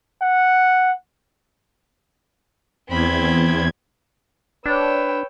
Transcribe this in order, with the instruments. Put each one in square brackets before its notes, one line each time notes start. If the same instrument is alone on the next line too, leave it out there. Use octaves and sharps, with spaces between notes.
[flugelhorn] F#5
[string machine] E2 G#6 [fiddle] C4 B5
[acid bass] D4 [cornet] B4 [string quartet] C#5 G5 E6